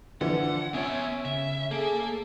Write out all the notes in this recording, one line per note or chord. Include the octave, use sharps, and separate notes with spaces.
D3 E3 F3 F#5
B3 C#4 C#5 E5 G#5
C#3 E5
A#3 G#4 A4